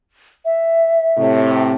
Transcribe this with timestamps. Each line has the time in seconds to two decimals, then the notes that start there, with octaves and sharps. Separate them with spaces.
0.45 E5
1.17 A2 C3